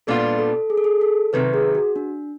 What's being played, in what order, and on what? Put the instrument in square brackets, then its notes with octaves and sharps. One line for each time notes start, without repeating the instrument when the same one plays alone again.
[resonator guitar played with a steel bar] A#2 G3 B3 D4 F4 [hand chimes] A4
[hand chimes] A4
G#4
A4
G#4
A4
[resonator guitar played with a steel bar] C3 D#3 F#3 [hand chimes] B4
[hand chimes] G#4
F#4
D4